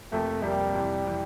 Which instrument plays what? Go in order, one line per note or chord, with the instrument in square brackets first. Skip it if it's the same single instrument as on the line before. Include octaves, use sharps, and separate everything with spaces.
[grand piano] F2 C3 F3 A#3 [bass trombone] A3
[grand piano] F2 C3 F3 A#3 [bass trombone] G3
[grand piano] F2 C3 E3
C3 E3